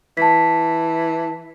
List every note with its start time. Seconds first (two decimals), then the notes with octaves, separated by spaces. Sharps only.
0.17 E3 A5 B6